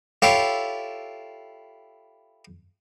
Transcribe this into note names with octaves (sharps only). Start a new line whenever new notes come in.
E4 F4 G4 A4 C#5